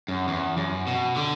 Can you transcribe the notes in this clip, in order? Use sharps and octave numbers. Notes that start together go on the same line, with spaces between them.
F#2
E2
F#2
B2
D3